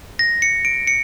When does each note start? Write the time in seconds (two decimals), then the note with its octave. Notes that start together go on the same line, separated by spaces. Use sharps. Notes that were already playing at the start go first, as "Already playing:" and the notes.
0.19 A#6
0.42 C#7
0.65 D7
0.87 C#7